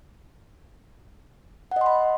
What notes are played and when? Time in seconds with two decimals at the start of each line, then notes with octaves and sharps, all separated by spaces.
1.71 F#5
1.76 D#5
1.81 C6
1.86 B5